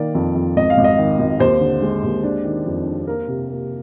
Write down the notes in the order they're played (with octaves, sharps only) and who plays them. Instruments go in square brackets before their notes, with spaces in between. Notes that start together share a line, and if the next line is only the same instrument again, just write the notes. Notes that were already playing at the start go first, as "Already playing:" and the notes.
Already playing: [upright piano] D#3 A#3 D5
F2
F2
G#1 D#5
F5
G#1
D#5
D#3
G#1
D#2 C5
D3
G#3
D#2
D4
D#3
F2
D4
A#3 A#4
C3
A#3